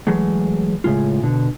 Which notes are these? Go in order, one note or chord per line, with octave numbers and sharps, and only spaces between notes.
E3 F#3 G#3 A3
A2 C#3 G#3 F4
B2 D3